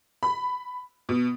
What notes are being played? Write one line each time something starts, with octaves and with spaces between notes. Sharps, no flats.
B5
B2